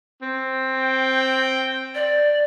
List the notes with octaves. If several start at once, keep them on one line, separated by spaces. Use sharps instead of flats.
C4
G5
D5